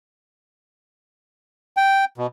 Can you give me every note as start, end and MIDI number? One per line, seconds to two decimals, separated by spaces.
1.77 2.05 79
2.18 2.27 47